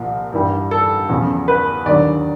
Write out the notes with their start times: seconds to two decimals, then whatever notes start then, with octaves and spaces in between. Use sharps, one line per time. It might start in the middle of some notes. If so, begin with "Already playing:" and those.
Already playing: C2 A#2 F3
0.32 G2 E3 G3
0.71 A4
1.09 E2 C#3 F3
1.48 B4
1.86 D#2 D3 F#3 D5